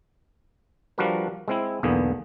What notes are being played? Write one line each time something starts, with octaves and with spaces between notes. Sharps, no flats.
F3 G3 D4 F#4 A#4 B4
G#3 C4 E4
B1 E2 D3 A#3 B3 G#4